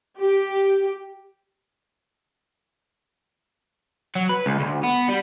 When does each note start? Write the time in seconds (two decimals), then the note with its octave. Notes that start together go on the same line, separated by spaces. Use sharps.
0.19 G4
4.16 F#3
4.29 B4
4.46 C#2
4.59 D2
4.83 B3
5.09 G3